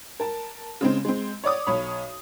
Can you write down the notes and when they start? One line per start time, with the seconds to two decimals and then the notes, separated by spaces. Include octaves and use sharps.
0.20 A#4 A5
0.81 C#3 G#3 C4
1.05 G#3 C4
1.44 C#5 D5 D6 D#6
1.66 B1 C#5 B5